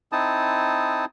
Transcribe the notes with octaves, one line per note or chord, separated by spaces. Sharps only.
C4 D#4 E4 A5 D#6